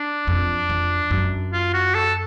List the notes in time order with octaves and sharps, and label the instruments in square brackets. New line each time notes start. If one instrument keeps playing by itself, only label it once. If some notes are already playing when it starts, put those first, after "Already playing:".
Already playing: [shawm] D4
[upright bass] F2
F2
F#2
[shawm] F4
F#4
A4